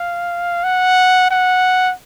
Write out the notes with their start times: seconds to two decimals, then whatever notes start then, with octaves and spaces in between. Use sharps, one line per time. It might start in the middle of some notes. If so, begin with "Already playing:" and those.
Already playing: F5
0.64 F#5
1.30 F#5